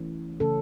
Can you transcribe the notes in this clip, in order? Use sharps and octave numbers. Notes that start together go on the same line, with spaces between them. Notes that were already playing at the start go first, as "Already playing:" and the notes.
Already playing: E3 A3 C#4
C#3 E3 A3 C#4 A4